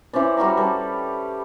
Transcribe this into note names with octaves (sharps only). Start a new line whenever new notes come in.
E3 C#4 C5 D5
G3 F#4 B4 A#5
G3 A4 B4